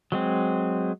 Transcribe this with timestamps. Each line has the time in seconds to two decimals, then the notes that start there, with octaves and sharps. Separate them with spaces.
0.12 F#3 G#3 C4